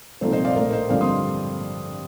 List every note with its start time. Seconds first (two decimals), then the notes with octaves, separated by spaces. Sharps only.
0.21 C2 A#2 F3 A#3 D#4 A4 C5
0.32 C5 D#5
0.45 D5 F5
0.50 D#5
0.55 A#1 A2 A3 A#4 D5
0.73 C5 D#5
0.89 G2 D3 F3 C4 D5 F5
1.01 C6 D#6